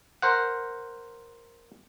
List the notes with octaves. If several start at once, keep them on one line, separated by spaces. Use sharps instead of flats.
A#4 C5 F#5